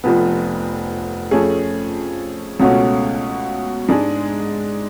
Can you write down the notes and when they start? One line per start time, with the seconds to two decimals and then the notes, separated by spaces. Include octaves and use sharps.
0.04 F1 F2 F3 B3
1.31 F2 F3 A3 C#4 G#4
2.60 C#2 B2 A3 C#4 F#4
3.89 G#2 G#3 D4 G#4